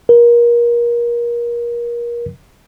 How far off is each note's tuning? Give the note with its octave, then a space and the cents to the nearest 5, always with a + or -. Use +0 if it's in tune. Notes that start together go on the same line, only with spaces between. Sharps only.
A#4 +30